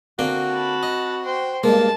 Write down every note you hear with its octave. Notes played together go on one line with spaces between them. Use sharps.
D3 A#3 C4 F#4 G5
A5 B5
D#5
C5 G5
G2 G#3 A#3 A5